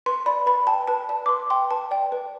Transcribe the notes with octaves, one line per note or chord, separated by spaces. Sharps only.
B4 C6
D5 B5
B4 B5
G5 A5
B4 A5
D5 A5
D6
B4 C6
G5 C6
B4 A5
D5 G5
B4